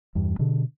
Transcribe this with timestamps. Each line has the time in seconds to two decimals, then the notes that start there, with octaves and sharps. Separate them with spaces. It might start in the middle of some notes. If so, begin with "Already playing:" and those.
0.15 E2 G2
0.39 B2 D3